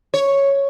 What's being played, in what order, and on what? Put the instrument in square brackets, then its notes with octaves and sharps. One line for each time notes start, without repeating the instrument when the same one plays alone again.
[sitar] C#5